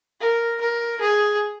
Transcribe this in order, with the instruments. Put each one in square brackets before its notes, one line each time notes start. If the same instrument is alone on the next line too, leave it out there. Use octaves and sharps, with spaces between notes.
[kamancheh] A#4
A#4
G#4